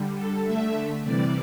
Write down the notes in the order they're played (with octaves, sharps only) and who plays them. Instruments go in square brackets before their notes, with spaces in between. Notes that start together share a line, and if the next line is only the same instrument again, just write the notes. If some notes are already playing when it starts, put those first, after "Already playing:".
Already playing: [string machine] D3 G3
A4
D3 A3 E5
C3 E3 G3 D5